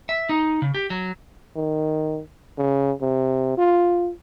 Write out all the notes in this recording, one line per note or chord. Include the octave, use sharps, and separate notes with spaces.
E5
D#4
C#3
G4
F#3
D#3
C#3
C3
F4